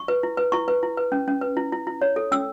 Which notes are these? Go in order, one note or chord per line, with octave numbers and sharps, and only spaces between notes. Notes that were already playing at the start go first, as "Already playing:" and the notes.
Already playing: C#6
B4
E4
B4
E4 C#6
B4
E4
B4
C#4
C#4
B4
E4
E4
E4
C#5
A4
C#4 E6